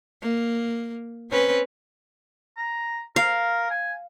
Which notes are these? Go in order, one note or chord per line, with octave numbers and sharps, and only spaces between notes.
A#3
C4 C#4 B4
A#5
A#4 F5
G#5